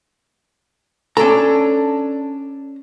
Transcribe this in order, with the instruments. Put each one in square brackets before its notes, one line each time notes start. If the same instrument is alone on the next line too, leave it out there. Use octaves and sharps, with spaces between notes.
[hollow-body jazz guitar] C#4 A#5 [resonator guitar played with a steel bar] D4 A4